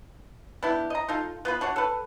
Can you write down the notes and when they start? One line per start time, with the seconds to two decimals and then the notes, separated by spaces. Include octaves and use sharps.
0.63 B3 D4 E4 G4
0.90 D#5 A#5
1.08 D#4 F4 A4
1.45 B3 F4 B4
1.61 D4 F#4 C#5 F#5
1.76 A4 B4